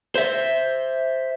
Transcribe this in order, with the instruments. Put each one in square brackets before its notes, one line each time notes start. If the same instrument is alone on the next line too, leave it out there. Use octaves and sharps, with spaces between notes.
[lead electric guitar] C5 E5